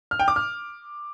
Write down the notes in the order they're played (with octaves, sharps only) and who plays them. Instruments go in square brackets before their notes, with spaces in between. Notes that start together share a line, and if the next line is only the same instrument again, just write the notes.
[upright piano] F6
G5
D6
F6